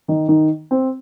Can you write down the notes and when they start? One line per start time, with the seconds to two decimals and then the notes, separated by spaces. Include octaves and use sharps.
0.08 D#3 D#4
0.28 D#3 D#4
0.71 C4